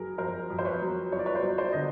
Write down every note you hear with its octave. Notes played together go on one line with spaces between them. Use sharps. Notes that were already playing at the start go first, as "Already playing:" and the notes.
Already playing: F#1 F#3 G#4 A#4
F2 A#4 C5
F2
C5
B4 C#5
F#3
F#1 C#5
D5
B4 C#5
C5 D5
F#3
C5 D5
D3 D#5